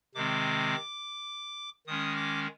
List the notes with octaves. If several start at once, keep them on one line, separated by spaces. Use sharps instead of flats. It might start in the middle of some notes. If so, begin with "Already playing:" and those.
C3 D#3 G#3 C4 D6
D#3 G#3 C#4 D#6
D6